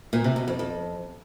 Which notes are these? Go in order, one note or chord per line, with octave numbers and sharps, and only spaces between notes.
A#2
C3
B2
F2
F2